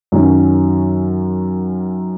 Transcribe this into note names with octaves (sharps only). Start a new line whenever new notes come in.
F#2 D#3 F#3 C#4